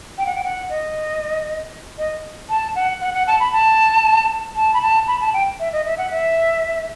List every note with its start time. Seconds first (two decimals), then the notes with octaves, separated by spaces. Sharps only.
0.18 G5
0.26 F#5
0.35 G5
0.44 F#5
0.70 D#5
1.98 D#5
2.49 A5
2.75 F#5
3.01 F#5
3.14 F#5
3.27 A5
3.40 B5
3.53 A5
4.56 A5
4.74 B5
4.82 A5
5.08 B5
5.21 A5
5.34 G5
5.60 E5
5.73 D#5
5.86 E5
5.98 F#5
6.11 E5